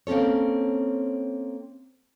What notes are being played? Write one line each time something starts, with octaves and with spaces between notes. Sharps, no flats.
A#3 C4 C#4 A4 C#5